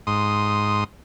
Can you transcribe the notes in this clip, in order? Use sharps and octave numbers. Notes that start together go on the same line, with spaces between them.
G#2 C6 D#6